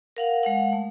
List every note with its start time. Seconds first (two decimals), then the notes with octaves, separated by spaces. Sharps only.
0.17 A#4 F5 F#5
0.43 G#3 F5 F#5
0.73 A3